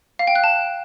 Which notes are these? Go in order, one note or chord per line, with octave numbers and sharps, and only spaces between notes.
F5
G5
F#6
A5